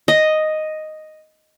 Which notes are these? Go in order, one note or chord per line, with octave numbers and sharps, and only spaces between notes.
D#5